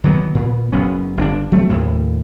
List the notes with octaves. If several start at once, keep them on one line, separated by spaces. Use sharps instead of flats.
D#3 E3 F#3 B3
A#2 B3
F#1 F#3 B3 C#4
G1 C4 D4
F#3 A3 C4
F1 D#2 A2 C#3